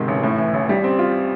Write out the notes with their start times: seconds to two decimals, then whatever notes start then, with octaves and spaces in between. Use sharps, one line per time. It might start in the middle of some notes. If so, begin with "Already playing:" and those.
Already playing: G#2 C3 D#3
0.08 A1
0.23 A2
0.38 E3
0.54 A1
0.69 G3
0.84 C4
0.99 F4